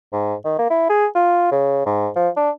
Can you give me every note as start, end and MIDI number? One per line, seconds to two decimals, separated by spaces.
0.13 0.35 44
0.45 0.55 51
0.58 0.66 58
0.70 0.87 64
0.89 1.06 68
1.15 1.46 65
1.52 1.83 49
1.86 2.09 44
2.16 2.29 53
2.36 2.50 62